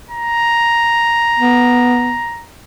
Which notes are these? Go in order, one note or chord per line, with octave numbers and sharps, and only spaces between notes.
A#5
B3